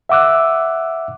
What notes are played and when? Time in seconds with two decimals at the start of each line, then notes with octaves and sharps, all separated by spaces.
0.09 E5 F#5 D6 E6 F#6